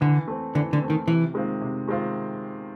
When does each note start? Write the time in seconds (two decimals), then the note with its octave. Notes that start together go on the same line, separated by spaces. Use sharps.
0.01 D3 E3
0.28 A3 C4
0.55 D3 E3
0.73 D3
0.81 A3 C4
0.90 D#3
1.07 C3 E3
1.34 D#3 G#3 C4 F4
1.61 C3
1.87 D#3 G#3 C4 F4